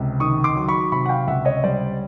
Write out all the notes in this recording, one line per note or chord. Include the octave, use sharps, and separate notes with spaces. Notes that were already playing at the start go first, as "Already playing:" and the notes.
Already playing: C#2 C3
D#3 C#6 D#6
C6 D6
F#3
B5 C#6
C3 B5 C#6
F#5
F5 G5
C#2 E5 F#5
C#5 D#5
G3 C5 D5